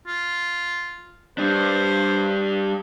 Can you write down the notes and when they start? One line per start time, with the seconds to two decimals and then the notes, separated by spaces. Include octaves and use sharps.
0.07 F4
1.38 G3 D4 C5